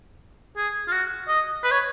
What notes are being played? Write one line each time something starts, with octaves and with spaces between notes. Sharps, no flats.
G#4
F4
F#4
D#5
B4
C#5